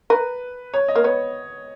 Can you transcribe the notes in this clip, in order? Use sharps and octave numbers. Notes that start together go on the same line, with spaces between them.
A#4 B4
C#5
D#5
A#3
B3 C#5